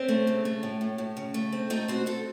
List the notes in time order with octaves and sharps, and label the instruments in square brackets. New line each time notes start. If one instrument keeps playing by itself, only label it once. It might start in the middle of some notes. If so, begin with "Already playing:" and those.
Already playing: [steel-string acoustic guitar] C4 C#4
A3
C#3
A3
A2
A2
A2
C#3
A3
C4
A3 D#4
C4 F#4
C4 A4